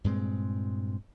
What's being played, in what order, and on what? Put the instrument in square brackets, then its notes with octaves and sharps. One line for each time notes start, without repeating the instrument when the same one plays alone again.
[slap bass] G2 A#2 G#3 C4